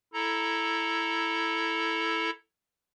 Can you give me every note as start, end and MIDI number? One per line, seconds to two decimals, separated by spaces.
0.14 2.30 64
0.14 2.30 69
0.14 2.30 82